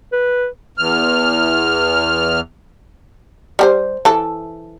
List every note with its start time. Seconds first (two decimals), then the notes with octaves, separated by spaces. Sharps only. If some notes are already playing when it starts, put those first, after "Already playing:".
0.12 B4
0.78 E2 F6
3.59 G3 G4 C5
4.05 E3 A4